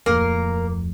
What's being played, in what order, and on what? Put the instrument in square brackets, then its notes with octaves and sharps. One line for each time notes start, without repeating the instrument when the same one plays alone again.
[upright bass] D1 F2 [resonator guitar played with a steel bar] A#3 A#4